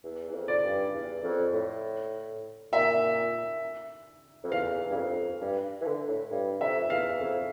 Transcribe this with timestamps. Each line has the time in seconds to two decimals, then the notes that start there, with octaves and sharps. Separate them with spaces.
0.04 E2
0.29 E2
0.34 F2
0.48 D5
0.64 G2
0.94 E2
1.23 F2
1.53 A2
2.72 A#2 E5
4.44 F2
4.51 E2 F5
4.90 G2
4.96 F2
5.41 G2
5.81 E3
5.86 D3
6.08 A2
6.31 G2
6.60 F2 E5
6.90 E2 F5
7.19 F2